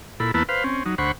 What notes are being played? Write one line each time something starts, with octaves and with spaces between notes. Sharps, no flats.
A#2 E4 A4 B5
E2 A#3 B3 E4 B4 A5
B4 C5 F5
C4 C#4
F#3 D#4
D2 C5 F#5 B5 C#6